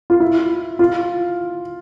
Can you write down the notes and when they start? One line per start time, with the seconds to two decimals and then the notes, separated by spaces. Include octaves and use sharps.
0.10 F4
0.20 E4
0.79 F4